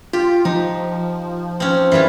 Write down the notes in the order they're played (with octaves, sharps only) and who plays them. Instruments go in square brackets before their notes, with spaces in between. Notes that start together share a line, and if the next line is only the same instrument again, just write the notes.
[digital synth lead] F4 [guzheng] G4
[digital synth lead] F3 [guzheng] D#4
[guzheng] C4 C#4
[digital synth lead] F#2 [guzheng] E3 G3 F4